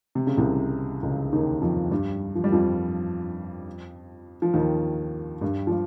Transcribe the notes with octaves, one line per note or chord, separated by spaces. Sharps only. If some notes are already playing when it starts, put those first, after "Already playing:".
C3
C#3
C2 C3
C#2 C#3
D#2 D#3
F2 F3
G2 G3
F3
G3
F2 F3
F3
D#2 D#3
G2 G3
F3
G3